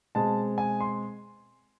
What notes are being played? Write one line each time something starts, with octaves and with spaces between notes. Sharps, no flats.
B2 G#3 C4 A5
G#5
C6